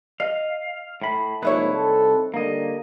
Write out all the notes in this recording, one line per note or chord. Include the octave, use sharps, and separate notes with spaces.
D#5 F5
A2 B5
C2 G#2 F3 A#3 D#4 E4 B4 C#5
C4 A4
D3 G3 A#3 D#5